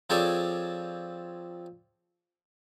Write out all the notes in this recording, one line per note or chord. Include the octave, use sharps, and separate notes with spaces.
F3 C4 G#4 A4 C#5 D5